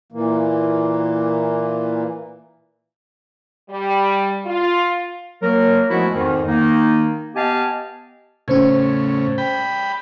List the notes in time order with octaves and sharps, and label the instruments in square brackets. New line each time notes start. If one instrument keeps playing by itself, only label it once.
[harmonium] A#2 E3 A#3
[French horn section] G3
F4
[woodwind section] F#3 A#3 A#4
F3 G#3 A3 B3 E4 F#4
F2 G#2 D#3
D#3 A#3 D#4
B3 G4 D#5 F5 G#5 A5
[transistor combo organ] A2 C#3 [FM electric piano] C#4 C5 G#6
[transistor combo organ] G5 B5